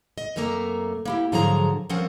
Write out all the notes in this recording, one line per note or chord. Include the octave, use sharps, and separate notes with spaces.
D#5
F#2 C3 A3 A#3 A#5
A#3 E4 G4
G#2 D3 F3 F#3 G#4 A#5
G2 F3 C4 C#4 A#4 F#5